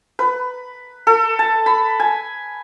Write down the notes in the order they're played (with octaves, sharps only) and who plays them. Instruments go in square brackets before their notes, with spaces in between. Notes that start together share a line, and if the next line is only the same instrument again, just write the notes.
[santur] B4
A4
A5
B5
G#5